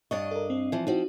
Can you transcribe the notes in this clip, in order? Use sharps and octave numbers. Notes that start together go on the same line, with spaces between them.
G2 D4 D#5 C#6 A6
A4 A#4
C4
E3 F3
F3 C4 D#4 F#4